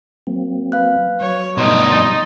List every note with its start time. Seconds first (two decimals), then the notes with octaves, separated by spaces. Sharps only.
0.27 F#3 A#3 C4
0.72 B4 F5 F#6
1.21 F#3 C#5
1.58 G2 B2 D#4 C6 C#6
1.89 F#3 C6 A6